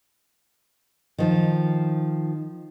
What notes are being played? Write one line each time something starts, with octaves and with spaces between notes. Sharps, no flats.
D#3 F3